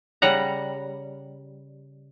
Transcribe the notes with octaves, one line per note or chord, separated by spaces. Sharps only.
C#3 G3 F#5 A#5